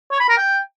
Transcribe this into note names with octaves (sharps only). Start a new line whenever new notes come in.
C#5
B5
A#4
G5